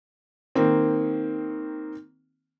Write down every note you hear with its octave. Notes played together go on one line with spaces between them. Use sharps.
D#3 A#3 C4